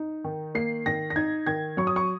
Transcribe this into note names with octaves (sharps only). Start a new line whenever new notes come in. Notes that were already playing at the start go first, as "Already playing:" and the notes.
Already playing: D#4
D#3
A#3 C7
D#3 A#6
A#6
D#4 G#6
D#3 G#6
F#3 C#6
D#6
C#6